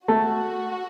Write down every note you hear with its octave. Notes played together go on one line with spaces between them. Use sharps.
A3 F#4